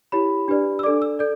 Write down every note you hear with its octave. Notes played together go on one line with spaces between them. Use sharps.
E4 G4 C#5 B5
D4 G4 B4 D5
E6
D4 A4 D5 D6
E6
A4 D5 G6